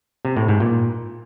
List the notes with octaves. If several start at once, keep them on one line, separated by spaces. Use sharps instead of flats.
C3
A2
G#2
A#2